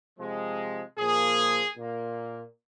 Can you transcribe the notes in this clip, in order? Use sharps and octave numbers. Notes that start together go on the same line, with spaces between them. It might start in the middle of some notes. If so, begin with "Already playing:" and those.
C3 F3 G#3
A#2 F3 A#3 G#4
A#2 A#3